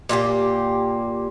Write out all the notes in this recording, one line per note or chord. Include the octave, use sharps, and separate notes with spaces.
A#2 A#3 F#4 G4